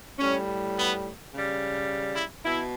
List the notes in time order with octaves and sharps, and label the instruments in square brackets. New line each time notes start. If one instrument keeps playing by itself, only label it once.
[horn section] A2 G3 C#4
B3
C#3 G3
E4
B2 E4